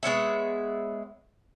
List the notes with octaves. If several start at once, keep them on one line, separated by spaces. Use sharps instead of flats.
G#3 B3 C#5 E5